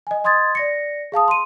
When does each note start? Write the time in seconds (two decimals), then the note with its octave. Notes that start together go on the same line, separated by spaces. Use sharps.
0.07 D#5 G#5
0.24 D#5 C6 D#6 G#6 A6
0.55 D5 A#6 C#7
1.12 G#4 F5 A5 D#6
1.28 C6 D#7